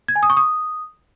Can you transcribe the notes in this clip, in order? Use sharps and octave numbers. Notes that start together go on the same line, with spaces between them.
G#6
G#5
D#6
C#6
D#6